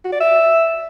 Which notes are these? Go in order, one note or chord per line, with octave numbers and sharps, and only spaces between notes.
F#4
D5
E5